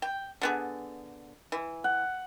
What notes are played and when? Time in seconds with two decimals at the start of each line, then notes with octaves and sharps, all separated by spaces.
0.02 G5
0.41 D3 B3 G#4
1.52 E3
1.84 F#5